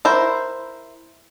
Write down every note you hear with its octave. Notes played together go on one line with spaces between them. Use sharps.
E4 A#4 C5